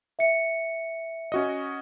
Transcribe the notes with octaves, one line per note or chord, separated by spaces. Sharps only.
E5 C#7
C#4 F#4 D#5